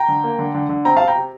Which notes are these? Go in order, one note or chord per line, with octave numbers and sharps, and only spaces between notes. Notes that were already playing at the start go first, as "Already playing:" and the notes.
Already playing: G5 A#5
D3
A#3
D3
D3
D3
C4 G5 A#5
F5 A5
C3
G5 A#5
C3